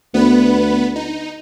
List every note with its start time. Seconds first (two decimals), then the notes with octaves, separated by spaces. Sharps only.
0.14 D2 B3 B4
0.96 D#4